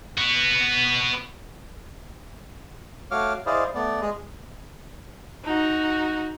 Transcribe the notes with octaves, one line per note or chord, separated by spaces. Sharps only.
B3 F#4
A3 F#4 C#5 F5 D6 F6
E4 G#4 C5 D5 D#5 F5
A3 B3 D5
G#3 G#4 D#5
D#4 F#4